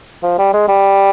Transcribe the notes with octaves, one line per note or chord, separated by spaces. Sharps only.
F3
G3
G#3
G3